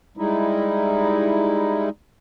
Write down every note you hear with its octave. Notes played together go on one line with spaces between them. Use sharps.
G3 G#3 D#4 E4